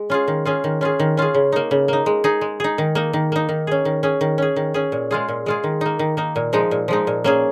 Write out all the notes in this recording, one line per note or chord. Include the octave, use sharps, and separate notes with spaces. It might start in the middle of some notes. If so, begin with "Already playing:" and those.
Already playing: G#3
C#4 F4 G#4
D#3
C#4 F4 G#4
D#3
C#4 F4 G#4
D#3
C#4 F4 G#4
C#3
A#3 D#4
C#3
A#3 D#4
G#3
D#4 G#4
G#3
D#4 G#4
D#3
A#3 D#4
D#3
A#3 D#4
D#3
C#4 G#4
D#3
C#4 G#4
D#3
C#4 G#4
D#3
C#4 G#4
A#2
G#3 F4 G#4
A#2
G#3 F4 G#4
D#3
A#3 D#4
D#3
A#3 D#4
A#2
F3 G#3 D#4
A#2
F3 G#3 D#4
A#2
A#3 C#4 G#4